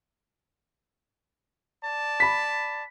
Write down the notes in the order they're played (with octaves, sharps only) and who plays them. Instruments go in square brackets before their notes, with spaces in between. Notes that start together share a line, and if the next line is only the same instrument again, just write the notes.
[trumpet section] D5 A5
[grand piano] B5 B6